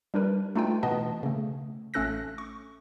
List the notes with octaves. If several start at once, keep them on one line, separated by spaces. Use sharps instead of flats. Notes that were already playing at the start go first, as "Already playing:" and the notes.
G3 D4 A#4 B4
A3 D4 D#4 F4 B4 G5
B2 E3 B3 D#5 A5
C#3 A3
A1 A3 C#4 A4 F#6 A#6
C#6